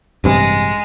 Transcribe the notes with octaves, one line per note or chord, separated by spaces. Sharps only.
A1 G2 C3 G#3